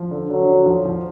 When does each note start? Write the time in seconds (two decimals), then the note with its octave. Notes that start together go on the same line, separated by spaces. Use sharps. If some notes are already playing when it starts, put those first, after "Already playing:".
Already playing: F3
0.11 D3
0.30 D3 F#3
0.47 D3
0.66 F3
0.85 F3